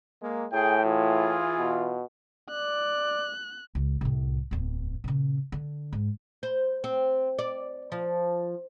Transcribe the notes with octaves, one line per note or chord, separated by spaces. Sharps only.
G#3 A#3
A2 G#4 G5
E3 F4 G#4
B2
D5 F#6
C#2
C2 A2
D1 E2
A#2 C#3
D3
G#2
C5
C4
D5
F3